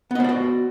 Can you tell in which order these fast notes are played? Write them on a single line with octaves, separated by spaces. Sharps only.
B3 D#5 C5 D5 F#4